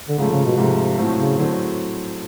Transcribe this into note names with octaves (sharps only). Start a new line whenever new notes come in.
D3
G#2 C#3 F3 A3
C#3
B2
G#2 C3 F3 A3
A2 F#3 A3 C4
C#3
A2 D3 F#3 A3 C4